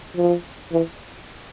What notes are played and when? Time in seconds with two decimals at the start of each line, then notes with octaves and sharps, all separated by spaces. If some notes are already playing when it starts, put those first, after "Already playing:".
0.16 F3
0.72 E3